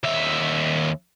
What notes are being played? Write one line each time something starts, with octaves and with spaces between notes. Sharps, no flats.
D#2 E5